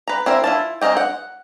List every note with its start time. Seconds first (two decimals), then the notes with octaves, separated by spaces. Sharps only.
0.07 B4 A#5
0.26 C4 E4 A#4
0.44 E4 F4 A5
0.81 G#3 C4 A#4 D#5 G5
0.97 F#5